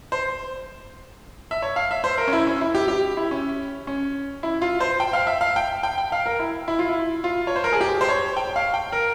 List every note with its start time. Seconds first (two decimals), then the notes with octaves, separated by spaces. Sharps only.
0.12 C5
1.51 E5
1.62 C#5
1.76 F5
1.91 E5
2.04 C5
2.18 A#4
2.27 C#4
2.33 E4
2.47 C#4
2.61 E4
2.75 G4
2.88 G4
3.17 E4
3.31 C#4
3.87 C#4
4.43 E4
4.62 F4
4.81 C5
5.00 G5
5.13 F5
5.27 E5
5.41 F5
5.56 G5
5.83 G5
5.98 G5
6.12 F5
6.26 A#4
6.39 E4
6.68 E4
6.79 F4
6.89 E4
7.24 F4
7.47 C#5
7.56 C5
7.64 A#4
7.73 G#4
7.81 G4
8.01 C5
8.09 C#5
8.37 G5
8.56 F5
8.74 G5
8.92 A#4